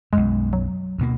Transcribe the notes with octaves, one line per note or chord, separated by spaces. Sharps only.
B1 F#2 G#3
F#3
D2 B2 A#3